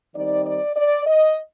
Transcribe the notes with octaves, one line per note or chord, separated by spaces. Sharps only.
D#3 G3 C4 D#4 D5
D5
D5
D#5